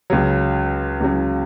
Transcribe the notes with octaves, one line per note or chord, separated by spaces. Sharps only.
C#2 C#3 F#3
C#2 C#3 F#3